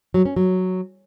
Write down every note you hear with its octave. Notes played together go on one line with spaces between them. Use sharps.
F#3
C#4
F#3